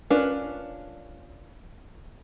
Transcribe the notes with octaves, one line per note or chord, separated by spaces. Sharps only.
C#4 D4 F4 A#4 B4